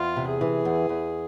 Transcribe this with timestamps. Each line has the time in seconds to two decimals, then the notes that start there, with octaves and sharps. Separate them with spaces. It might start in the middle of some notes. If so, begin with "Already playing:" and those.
Already playing: E2 F4
0.16 C3
0.29 G#4
0.41 E3
0.65 E2
0.89 E2